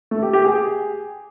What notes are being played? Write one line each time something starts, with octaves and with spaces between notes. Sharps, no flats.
A3
G4
G4
G#4